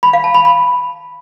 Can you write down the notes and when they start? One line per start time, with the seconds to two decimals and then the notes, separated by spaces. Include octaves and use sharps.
0.03 B5
0.13 F5
0.24 A5
0.34 B5
0.45 B5